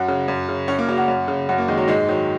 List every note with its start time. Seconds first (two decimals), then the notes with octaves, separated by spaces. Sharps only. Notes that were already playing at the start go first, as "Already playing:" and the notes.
Already playing: F#2 F#4
0.08 C#3
0.28 F#2
0.49 C#3
0.68 F#2 C#4
0.79 A#3
0.88 C#3 F#3
0.98 F#4
1.08 F#2
1.28 C#3
1.49 F#2 F#4
1.58 A#3
1.68 D#3 G#3
1.78 F#3
1.88 G#2 G#3
2.09 D#3 F#3